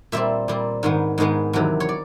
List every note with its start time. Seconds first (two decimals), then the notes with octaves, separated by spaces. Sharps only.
0.12 A#2 G3 C4 E5
0.48 A#2 G3 C4
0.83 G#2 D#3 G#3 B3
1.18 G#2 D#3 G#3 B3 D#5
1.53 E2 C3 D#3 F#3
1.80 C#5
1.89 D5